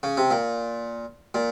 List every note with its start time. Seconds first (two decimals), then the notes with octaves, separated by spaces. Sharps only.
0.03 C#3
0.17 C3
0.31 A#2
1.34 A#2